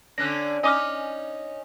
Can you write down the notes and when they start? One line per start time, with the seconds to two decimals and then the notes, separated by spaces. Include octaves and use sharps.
0.18 D3 C#4 D4 F#6 A#6
0.63 C#4 D#4 D#5 G#5 D6 F6